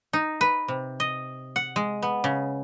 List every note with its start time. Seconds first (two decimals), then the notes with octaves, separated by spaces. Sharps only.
0.13 D#4
0.41 B4
0.68 C3
1.00 D#5
1.56 F#5
1.76 G#3
2.02 B3
2.24 C#3